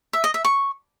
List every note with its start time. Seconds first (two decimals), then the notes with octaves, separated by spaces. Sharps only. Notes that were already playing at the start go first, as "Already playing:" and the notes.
0.13 E5
0.24 D#5
0.34 E5
0.45 C#6